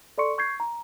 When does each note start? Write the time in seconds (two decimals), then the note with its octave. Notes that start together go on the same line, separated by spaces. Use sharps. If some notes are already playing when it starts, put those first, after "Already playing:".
0.18 A4 D5 C6 C#6 C#7
0.38 C#6 G6 G#6 C7
0.60 A#5